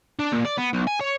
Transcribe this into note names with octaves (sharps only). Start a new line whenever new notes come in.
D4
A#2
D5
B3
B1
G#5
C#5